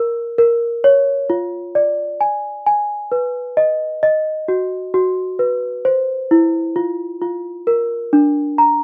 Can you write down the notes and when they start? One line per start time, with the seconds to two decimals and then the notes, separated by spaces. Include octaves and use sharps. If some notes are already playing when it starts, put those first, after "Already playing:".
Already playing: A#4
0.38 A#4
0.84 C#5
1.30 F4
1.75 D5
2.21 G#5
2.66 G#5
3.12 B4
3.57 D#5
4.03 D#5
4.48 F#4
4.94 F#4
5.39 B4
5.85 C5
6.31 E4
6.76 F4
7.22 F4
7.67 A#4
8.13 D4
8.58 A#5